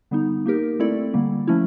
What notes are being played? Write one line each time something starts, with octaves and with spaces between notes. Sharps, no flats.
D3 G3 B3 D#4
A#3 D#4 G4 A#4
A3 C4 E4 A4 D5
D3 G3 A#3
F3 A3 C#4 E4